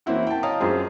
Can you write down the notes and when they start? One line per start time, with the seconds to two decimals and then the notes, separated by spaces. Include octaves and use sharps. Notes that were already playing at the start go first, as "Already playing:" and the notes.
0.06 E3 A#3 C4 C#4 E4 F#4
0.27 G5 A5
0.43 C#5 D#5 F5 A5 A#5 D#6
0.60 F#2 C4 F4 G#4 C5